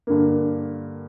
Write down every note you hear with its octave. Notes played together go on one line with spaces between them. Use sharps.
G2 D3 A#3